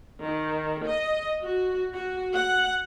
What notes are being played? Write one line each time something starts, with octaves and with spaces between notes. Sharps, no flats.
D#3
D#5
F#4
F#4
F#5